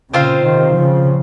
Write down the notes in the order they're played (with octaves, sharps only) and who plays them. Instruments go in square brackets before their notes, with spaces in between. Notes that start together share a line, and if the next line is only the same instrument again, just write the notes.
[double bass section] A#2 C#3 [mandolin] C4 F4 C5 F5
[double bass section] C3 D#3
C#3 F3